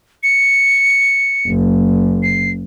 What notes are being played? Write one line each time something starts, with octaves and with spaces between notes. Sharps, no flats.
C#7
F#1
C7